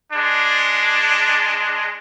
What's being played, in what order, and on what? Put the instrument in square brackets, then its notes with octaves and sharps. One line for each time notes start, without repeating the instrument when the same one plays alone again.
[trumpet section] G#3 D4